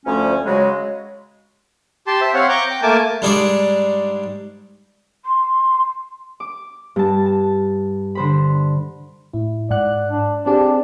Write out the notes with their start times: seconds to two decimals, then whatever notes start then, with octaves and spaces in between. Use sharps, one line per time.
0.05 D2 F3 A3 C#4
0.46 C#3 F#3 G#3
2.07 G4 A5 C6
2.21 C5 E5
2.34 C4 C#5 F5 F#5
2.49 A#5 C#6 D6 G6
2.71 G5
2.83 A3 A#3 A#4 G#5 A5 D6
3.22 G#2 G3 D4 G#4 D5 C#6
5.25 C6
6.40 D6
6.96 G2 A5
7.26 A5
8.15 D3 C5 B5
9.33 A2 E4
9.70 G#2 D5 F#5 F#6
10.10 D4
10.46 C4 D4 G4 G#4